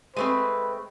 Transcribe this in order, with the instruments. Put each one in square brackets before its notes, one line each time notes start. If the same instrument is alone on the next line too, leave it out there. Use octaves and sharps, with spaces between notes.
[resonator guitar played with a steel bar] G#3 A3 C4 [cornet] B4